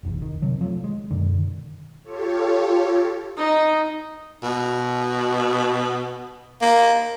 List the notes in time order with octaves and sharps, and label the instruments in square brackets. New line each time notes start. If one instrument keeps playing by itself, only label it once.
[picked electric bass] F1 B1 E2
D#3
C3 D#3 F#3
F3 F#3 G#3 A3
G#3
F#2 B2 D3 D#3
[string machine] F4 G4 A4 C#5
[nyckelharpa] D#4
[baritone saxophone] B2
A#3